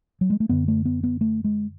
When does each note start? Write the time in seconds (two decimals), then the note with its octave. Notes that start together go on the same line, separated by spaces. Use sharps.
0.21 F#3
0.30 G#3
0.40 A3
0.49 F#2 D3 B3
0.68 A3
0.85 B3
1.04 B3
1.21 A3
1.44 G#3